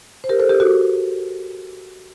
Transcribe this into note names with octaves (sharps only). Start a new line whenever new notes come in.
C5
G4 A#4
A4 C5
G4 A#4
F#4 A4